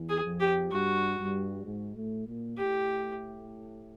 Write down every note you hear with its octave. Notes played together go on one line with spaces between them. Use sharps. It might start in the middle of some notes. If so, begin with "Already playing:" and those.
Already playing: E2 E3
G#4
F2 F3
G4
G2 G3 F#4
G2 G3
G#2 G#3
A2 A3
A#2 A#3
A2 A3 G4